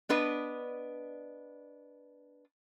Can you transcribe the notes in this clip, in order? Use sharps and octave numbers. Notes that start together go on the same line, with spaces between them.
B3 D4 B4 D#5